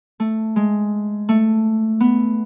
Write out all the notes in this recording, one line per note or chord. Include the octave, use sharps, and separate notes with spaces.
A3
G#3
A3
B3